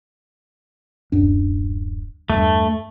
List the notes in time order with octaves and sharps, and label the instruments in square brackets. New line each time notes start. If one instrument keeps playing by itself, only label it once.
[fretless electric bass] D1 F#2 D4
[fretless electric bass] E2 G2 [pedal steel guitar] A3